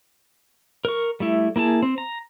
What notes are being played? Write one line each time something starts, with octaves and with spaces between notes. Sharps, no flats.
A#4 C#6
G3 A3 E4
A#3 E4 G#4 A5
C4
A#5